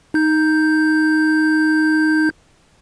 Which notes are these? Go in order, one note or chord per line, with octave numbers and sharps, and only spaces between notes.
D#4 G6